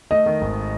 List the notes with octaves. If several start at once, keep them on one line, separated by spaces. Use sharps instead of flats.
A3 D#5
D#3
G#1